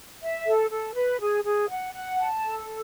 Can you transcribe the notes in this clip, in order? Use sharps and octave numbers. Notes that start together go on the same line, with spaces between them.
E5
A4
A4
B4
G#4
G#4
F#5
F#5
A5
A4